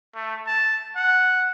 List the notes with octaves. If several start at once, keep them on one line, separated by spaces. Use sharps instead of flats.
A3
A5
F#5